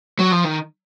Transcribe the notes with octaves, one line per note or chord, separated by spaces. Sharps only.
F#3
F3
D#3